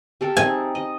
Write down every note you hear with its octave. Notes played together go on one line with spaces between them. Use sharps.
G4 A4 A#4
C4 D#4 G#5
D#5